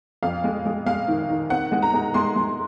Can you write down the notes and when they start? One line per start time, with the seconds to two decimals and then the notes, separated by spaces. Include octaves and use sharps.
0.23 F2 F5
0.44 G#3
0.65 G#3
0.86 G#3 F5
1.08 D#3
1.29 D#3
1.50 C4 F#5
1.72 G#3
1.82 A#5
1.94 G#3
2.14 G#3 C6
2.36 G#3